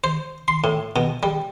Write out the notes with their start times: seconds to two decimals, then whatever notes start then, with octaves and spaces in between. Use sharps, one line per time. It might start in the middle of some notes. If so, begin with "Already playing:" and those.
0.04 C5
0.48 C6
0.64 A2
0.96 B2
1.23 G3